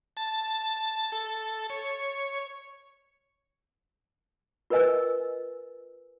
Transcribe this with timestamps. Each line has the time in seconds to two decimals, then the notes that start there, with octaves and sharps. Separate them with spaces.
0.17 A5
1.12 A4
1.70 C#5
4.70 F4 A#4 B4 D#5 G#5 E6